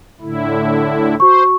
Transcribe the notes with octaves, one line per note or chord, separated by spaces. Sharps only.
A2 D3 E4
F#4 C5 C#6